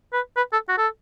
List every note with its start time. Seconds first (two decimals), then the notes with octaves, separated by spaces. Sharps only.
0.13 B4
0.36 B4
0.53 A4
0.69 F#4
0.78 A4